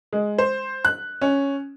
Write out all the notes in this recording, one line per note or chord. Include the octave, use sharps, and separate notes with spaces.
G#3
C5
F#6
C#4